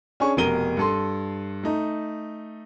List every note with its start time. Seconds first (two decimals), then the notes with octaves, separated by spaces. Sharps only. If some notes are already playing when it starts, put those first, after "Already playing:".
0.20 C#4 D4 G#4 C#6
0.37 F1 B2 A#4 D#7 G7
0.77 G2 A4 C6
1.63 A3 D#4